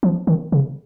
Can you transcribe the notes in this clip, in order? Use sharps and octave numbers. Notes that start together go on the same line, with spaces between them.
F3
D#3
C#3